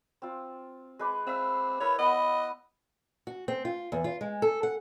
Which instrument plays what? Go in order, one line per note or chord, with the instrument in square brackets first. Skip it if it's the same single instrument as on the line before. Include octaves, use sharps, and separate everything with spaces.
[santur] C4 F4
G#3 B4 D6
[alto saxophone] C4 [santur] E5 F5
[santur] E4 A#4 B4 [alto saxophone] C#5
[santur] B3 F#5 B5 [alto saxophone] D#5
[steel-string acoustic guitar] F#4
C4
F4
E2
F4
G#3
A4
F#5